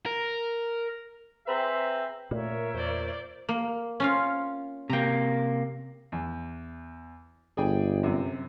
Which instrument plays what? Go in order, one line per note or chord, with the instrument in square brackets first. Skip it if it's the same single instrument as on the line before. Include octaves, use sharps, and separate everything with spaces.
[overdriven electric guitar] A#4
[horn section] C4 G#4 B4 C5 E5 A#5
[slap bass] A#2 [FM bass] A3 [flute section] A#4 C#5 E5
[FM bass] E2 [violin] C5 D5
[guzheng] A#3
C#4 F4 F5
[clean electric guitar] C3 A#3 [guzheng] G5 A#5
[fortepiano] E2
[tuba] G1 [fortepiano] G#4 D5 G5
[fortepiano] F#2 C3